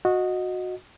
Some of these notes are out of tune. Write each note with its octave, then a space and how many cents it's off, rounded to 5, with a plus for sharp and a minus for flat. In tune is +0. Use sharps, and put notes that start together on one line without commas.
F#4 -15 D#5 +0